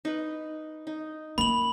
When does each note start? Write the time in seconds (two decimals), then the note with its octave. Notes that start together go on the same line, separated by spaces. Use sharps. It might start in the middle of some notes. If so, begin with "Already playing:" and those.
0.05 D#4 B4
0.87 D#4
1.38 A#3 B5 F#7